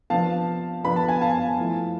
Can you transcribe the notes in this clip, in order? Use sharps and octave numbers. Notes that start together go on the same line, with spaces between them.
C3 F3 B3 D4 F5 A5
C3 F3 B3 D4 B5
A5
G#5
F5 A5
F3 A3 E4